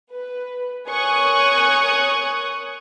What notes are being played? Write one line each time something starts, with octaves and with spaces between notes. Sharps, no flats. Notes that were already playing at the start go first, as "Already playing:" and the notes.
B4
A#4 C#5 G#5 C#6 D#6 F#6